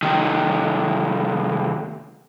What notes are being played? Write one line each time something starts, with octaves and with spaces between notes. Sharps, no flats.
C2 D#3